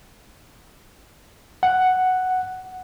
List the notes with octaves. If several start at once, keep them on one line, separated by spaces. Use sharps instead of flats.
F#5